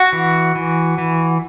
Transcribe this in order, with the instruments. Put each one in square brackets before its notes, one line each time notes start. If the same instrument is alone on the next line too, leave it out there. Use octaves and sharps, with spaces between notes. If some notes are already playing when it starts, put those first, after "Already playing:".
Already playing: [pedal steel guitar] F#4
E3
E3
E3